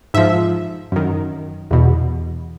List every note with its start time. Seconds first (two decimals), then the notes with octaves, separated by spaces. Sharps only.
0.14 G#2 F3 E5
0.92 F#2 D#3
1.71 E2 B2